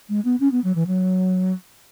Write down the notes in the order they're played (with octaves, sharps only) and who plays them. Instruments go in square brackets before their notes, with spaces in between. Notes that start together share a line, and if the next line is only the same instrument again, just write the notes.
[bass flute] G#3
B3
C#4
B3
F#3
E3
F#3